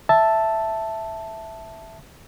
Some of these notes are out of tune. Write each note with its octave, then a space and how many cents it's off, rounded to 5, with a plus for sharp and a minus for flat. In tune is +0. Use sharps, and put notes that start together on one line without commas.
E5 +0 A5 +0